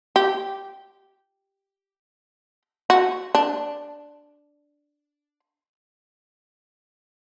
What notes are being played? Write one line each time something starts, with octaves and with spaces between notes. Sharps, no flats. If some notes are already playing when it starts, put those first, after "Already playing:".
G4
F#4
D4